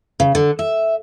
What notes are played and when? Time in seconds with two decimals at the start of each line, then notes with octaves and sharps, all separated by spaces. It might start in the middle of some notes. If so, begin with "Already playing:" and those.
0.20 C#3
0.35 D3
0.59 E5